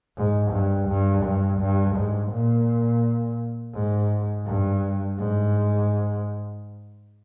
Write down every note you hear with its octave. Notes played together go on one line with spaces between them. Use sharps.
G#2
G2
G2
G2
G2
G#2
A#2
G#2
G2
G#2